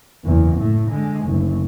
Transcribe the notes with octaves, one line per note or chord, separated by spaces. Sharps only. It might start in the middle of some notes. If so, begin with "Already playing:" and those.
F#1 E2
A2 A3
D3 G#3
F#1 D2